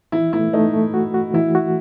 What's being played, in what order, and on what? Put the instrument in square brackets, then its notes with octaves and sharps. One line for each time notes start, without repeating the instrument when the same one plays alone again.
[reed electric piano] E3 [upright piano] E4
[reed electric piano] A3 [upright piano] E4
[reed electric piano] A3 [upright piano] D#4
[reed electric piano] A3
F#4
F#4
[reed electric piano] E3 [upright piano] E4
[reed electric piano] F#4